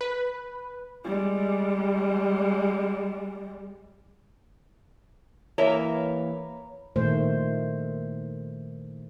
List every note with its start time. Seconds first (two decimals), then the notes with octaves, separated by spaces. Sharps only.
0.01 B4
1.04 G3 G#3
5.58 E3 A#3 A#4 B4 C#5 E5
6.96 A#2 D#3 A3 C5